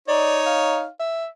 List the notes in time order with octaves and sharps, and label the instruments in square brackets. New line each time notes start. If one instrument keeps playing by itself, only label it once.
[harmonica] D#4 C#5 [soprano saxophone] D5
[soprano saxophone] F5
E5